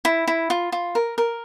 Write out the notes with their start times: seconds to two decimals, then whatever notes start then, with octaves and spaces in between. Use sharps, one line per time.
0.05 E4
0.28 E4
0.50 F4
0.72 F4
0.95 A#4
1.18 A#4